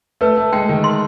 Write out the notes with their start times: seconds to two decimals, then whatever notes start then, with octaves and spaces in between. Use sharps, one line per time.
0.21 A3 B4
0.37 A3
0.53 G#3 G5
0.69 D#3
0.84 C6